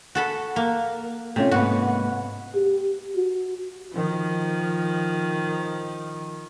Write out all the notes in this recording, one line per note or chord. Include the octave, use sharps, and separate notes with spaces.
F#4 A4 B5
A#3
C3 A3 C#4 F4
G#2 A#3 B3 F#4
G4
F#4
D#3 F3